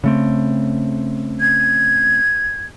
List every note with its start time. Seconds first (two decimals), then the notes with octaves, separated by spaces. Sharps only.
0.04 C#3 A3 C4
1.40 G#6